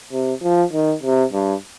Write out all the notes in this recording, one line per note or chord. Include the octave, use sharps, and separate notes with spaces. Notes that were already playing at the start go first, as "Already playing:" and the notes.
C3
F3
D#3
C3
G2